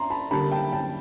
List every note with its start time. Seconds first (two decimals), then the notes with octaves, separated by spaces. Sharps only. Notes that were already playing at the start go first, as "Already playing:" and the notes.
Already playing: A#5 C6
0.10 A5 B5
0.31 D3 G3 A#3 A5 B5
0.52 G5 A5
0.73 G5 A5